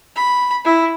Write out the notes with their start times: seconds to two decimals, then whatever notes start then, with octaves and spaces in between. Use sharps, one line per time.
0.16 B5
0.65 E4